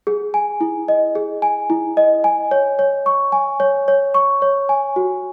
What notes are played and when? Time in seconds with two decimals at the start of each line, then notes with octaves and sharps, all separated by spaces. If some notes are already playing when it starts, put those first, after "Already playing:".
0.07 G#4
0.34 G#5
0.61 E4
0.88 D#5
1.15 G#4
1.42 G#5
1.70 E4
1.97 D#5
2.24 G#5
2.51 C#5
2.79 C#5
3.06 C#6
3.32 G#5
3.60 C#5
3.88 C#5
4.14 C#6
4.42 C#5
4.69 G#5
4.96 F#4